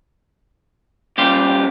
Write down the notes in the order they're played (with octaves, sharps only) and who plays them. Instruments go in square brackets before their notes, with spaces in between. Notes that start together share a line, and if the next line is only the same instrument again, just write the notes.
[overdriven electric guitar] A#2 C#3 [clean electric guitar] G3 F4 G4